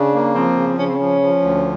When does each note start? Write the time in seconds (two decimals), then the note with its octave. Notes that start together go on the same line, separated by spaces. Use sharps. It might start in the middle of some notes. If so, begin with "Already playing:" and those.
Already playing: C#3 D4
0.14 A#3
0.35 F3 C4
0.56 C#3
0.78 C#3 C#4
0.87 C4
0.96 F3 C#4
1.21 F3
1.42 D2